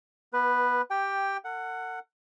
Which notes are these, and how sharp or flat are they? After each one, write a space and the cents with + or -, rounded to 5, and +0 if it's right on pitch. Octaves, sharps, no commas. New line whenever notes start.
B3 -25 B4 +0
G4 +0 G5 +5
A4 +45 F#5 +0